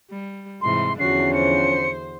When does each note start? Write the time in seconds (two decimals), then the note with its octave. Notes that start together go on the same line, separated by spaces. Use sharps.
0.11 G3
0.62 G#2 C3 E3 C6
0.99 E2 D3 F3 C#4 D4 F#4 C7
1.34 C5 C#7